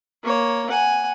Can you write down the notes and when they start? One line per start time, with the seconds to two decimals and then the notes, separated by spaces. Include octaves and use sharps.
0.23 A#3 C#5
0.70 F#5 G#5